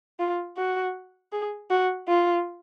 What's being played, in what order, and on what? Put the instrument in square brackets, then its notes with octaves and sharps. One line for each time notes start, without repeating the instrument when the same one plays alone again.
[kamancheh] F4
F#4
G#4
F#4
F4